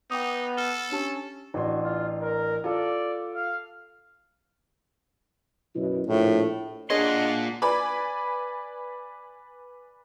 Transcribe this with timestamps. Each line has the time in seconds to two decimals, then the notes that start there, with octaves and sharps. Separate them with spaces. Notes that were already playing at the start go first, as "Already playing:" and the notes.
0.11 B3 D#4 G5 D6 D#6
0.58 A4 F6 G7
0.92 C#4 D4 G4 A5
1.54 A1 D4 F#4 C6
1.83 F4
2.21 A#4
2.64 F4 A4 D5
3.35 F5
5.75 F#2 B2 E4
6.07 A#1 A2
6.90 A#2 D4 G#4 C#5 D#5 F#5 C6
7.62 B4 D5 G#5 B5